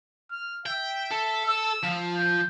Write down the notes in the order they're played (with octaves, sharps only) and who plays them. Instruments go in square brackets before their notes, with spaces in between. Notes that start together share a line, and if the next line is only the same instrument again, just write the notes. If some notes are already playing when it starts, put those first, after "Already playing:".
[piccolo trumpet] F6
[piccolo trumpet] E5 [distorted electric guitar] G5
[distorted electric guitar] A4
[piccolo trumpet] E6
[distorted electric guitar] F3
[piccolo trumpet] G6